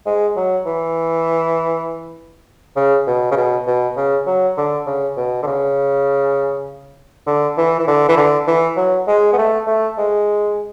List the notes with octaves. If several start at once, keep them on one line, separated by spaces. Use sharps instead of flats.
G#3
F#3
E3
C#3
B2
C#3
B2
B2
C#3
F#3
D3
C#3
B2
D3
C#3
D3
E3
E3
D3
E3
D3
E3
F#3
G#3
B3
A3
A3
G#3